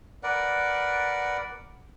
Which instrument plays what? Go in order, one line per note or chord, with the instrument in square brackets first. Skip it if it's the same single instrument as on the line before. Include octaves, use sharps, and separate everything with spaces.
[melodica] A#4 B4 D5 F#5